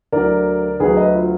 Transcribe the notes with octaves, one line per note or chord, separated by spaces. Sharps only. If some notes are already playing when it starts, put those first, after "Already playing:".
D2 D3 F#3 A#4 D5
D2 D3 F#3 G#4 B4
B4 D#5
F4